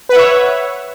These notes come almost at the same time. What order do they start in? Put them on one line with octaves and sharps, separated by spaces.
B4 F#5 E5 C#5